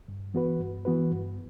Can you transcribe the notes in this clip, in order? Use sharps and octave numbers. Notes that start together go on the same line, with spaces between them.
G2
E3 B3 F#4 B4
G2
E3 B3 F#4 B4
G2